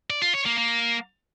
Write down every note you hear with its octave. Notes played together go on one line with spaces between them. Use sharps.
D5
F4
C#5
A#3
A#3